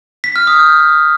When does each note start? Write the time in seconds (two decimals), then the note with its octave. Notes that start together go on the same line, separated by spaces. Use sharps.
0.24 B6
0.36 F6
0.47 D#6
0.59 G6